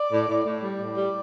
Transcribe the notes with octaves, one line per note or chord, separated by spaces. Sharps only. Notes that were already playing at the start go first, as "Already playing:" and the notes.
Already playing: D5
A2
A2
A2
G3
A2 D5
G3